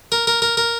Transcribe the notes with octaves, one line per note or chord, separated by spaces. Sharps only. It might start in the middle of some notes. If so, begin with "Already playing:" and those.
A#4
A#4
A#4
A#4